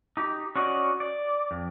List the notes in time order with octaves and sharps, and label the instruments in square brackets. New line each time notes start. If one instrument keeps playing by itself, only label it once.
[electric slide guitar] D#4 G4
C#4 F#4 D5 D#5
D5
F2